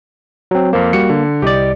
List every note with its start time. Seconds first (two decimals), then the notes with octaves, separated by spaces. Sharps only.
0.51 F#3 C4
0.73 F2 A#3 C5
0.93 G3 F#4 C#7
1.10 D3
1.42 C2 G4 D5 D#5